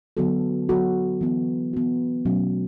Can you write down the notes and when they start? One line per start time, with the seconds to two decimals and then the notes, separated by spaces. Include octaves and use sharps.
0.17 D3 F#3 B3 F#4 A4
0.69 D3 F#3 B3 F#4 A4
1.21 E3 B3 F#4
1.73 E3 B3 F#4
2.25 B2 F#3 A3 C#4